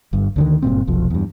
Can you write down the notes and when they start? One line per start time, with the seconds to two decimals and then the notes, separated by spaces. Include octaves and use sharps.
0.13 G1 G2
0.36 D2 D3 D#3
0.62 F#1 G2 A#2 C4
0.87 F1 B1 F3
1.10 E2 G2